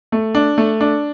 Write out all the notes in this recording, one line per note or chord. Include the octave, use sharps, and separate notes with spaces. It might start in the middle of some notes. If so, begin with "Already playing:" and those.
A3
D4
A3
D4